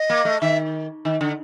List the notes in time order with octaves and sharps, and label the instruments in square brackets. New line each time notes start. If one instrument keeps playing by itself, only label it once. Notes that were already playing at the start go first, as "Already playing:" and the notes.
Already playing: [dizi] D#5
[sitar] A#3
A3
[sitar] D#3 [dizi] E5
[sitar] D#3
D3